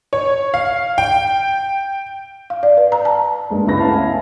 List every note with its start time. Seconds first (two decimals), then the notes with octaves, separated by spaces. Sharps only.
0.13 C#5
0.54 F5
0.98 G5
2.50 F5
2.63 D5
2.77 B4
2.92 A#5
3.05 A5
3.50 G2 G#3 A#3
3.67 C#2 E4 B4 B5 A#6
3.79 A3 B3 C#4 E5 F5 A5
3.93 D#5 G#5